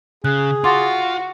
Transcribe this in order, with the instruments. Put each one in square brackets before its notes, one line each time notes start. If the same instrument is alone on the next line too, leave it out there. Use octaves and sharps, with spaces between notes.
[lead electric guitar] C#3 [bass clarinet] G#4 [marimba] F#6
[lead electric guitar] F4 [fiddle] F#4 [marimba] C6 D6 A6